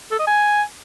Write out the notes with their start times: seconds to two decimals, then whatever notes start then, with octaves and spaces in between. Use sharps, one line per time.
0.11 A4
0.19 D#5
0.27 G#5